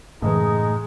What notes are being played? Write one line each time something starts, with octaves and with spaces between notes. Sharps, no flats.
F#2 A2 C#3 E3 G#3 D#4 D#5